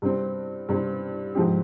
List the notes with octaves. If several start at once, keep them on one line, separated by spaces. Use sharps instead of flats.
G2 G3 C4
G2 G3 C4
G#2 F3 C4 G4